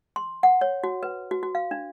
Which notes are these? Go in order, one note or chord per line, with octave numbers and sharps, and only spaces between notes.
C6
F#5
C#5
F#4
B4
F#4
F#4
F5
D4